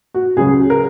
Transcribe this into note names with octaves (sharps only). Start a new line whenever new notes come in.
F#4
C#2 C#3 F#3 G#4
A#4